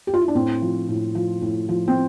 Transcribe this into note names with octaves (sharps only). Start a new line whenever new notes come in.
G4
F4
E4
D4
A2 C4
F3
A2
F3
A2
F3
C4